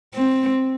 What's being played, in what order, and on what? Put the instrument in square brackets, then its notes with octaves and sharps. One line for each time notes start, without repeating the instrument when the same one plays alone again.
[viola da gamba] C4